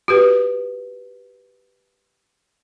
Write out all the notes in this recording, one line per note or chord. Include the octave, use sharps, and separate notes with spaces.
F#4 G4 B4